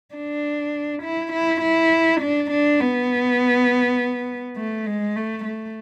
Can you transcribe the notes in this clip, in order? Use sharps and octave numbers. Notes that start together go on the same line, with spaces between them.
D4
E4
E4
E4
D4
D4
B3
A3
G#3
A3
A3